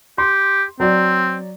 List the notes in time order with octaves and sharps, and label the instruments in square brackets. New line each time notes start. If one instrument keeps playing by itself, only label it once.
[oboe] G4 [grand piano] C6
[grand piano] F#3 D5 [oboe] C4